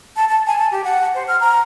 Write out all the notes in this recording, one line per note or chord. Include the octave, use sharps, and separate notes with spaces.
A5
A5
G#5
A5
G4
F#5
C5
F6
A#5